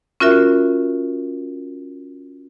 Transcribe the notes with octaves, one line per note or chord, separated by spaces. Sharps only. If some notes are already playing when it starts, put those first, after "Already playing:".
C#4 F4 F#4 A#4 E5